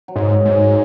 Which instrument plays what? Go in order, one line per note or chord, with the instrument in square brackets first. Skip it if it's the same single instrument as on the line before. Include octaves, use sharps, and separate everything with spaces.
[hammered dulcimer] F#3
[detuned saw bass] G#2
G#2
[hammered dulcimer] G#3